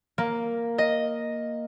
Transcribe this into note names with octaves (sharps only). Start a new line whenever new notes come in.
A#3
D#5